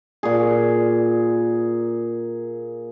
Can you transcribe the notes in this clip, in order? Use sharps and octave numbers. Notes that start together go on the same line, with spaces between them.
A#2 G#4